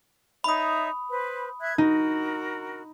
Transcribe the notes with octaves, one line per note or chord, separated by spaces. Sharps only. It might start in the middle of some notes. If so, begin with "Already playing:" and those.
D#4 C#5 E5 B5 D#6
B4 C5
E5 F#6 G#6
D#4 F#4 A#4